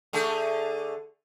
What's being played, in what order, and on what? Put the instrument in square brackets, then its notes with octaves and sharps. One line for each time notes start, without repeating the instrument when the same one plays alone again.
[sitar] D3 A3 G#4